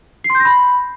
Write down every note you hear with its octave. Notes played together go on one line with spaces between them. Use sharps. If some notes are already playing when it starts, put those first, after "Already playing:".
C7
C6
G6
A#6
B5